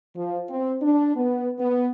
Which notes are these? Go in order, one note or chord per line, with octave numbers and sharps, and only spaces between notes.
F3
C4
D4
B3
B3